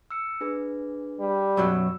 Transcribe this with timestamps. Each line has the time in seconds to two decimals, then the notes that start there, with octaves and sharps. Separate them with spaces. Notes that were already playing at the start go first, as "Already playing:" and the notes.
0.10 E6 F6 C#7
0.41 D4 G#4 B4
1.20 G3
1.57 F#2 B2 F#3 E6